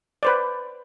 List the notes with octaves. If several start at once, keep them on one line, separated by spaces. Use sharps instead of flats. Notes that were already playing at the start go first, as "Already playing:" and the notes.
B4 C5 D5